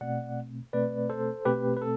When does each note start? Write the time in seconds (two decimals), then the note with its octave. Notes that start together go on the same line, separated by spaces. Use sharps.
0.01 B2 A3 C4 D5 F#5
0.73 B2 A3 C4 B4 D5
1.10 A4 C5
1.45 B2 A3 C4 G4 B4
1.77 B4
1.82 A4